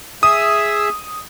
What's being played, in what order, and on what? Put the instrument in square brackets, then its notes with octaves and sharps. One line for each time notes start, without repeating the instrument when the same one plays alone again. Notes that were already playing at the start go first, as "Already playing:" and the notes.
[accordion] G#4 E5 [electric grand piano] D#6